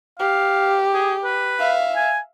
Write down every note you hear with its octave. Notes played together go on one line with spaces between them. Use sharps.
G4 F5
G#4
B4
E5 F5
G#5